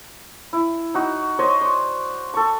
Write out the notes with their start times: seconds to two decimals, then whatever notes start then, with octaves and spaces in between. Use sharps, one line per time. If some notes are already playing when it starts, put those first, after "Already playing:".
0.53 E4
0.94 D#4 F#4
1.39 C5 C#5 D#5
1.61 D5
2.34 A4 C#6